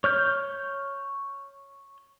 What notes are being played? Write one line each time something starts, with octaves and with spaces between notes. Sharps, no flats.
C#5 F6 G6